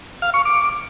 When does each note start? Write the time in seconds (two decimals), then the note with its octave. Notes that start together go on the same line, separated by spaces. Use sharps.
0.22 F5
0.34 C#6
0.45 D6